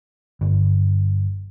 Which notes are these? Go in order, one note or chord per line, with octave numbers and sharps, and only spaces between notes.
G1